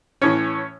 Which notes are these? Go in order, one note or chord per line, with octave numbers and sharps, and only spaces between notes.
A2 E3 C#4 C#5